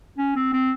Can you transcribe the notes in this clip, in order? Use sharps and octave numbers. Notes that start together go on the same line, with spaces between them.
C#4
C4
C4